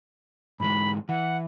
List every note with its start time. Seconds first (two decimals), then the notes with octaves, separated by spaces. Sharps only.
0.60 G#2 E3 G#3 B5
1.09 E3 F#5